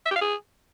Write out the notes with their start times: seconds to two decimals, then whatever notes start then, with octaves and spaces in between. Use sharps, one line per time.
0.06 E5
0.11 G4
0.16 F5
0.21 G#4